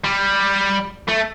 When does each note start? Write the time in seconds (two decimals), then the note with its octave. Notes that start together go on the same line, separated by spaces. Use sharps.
0.04 G3
1.08 A3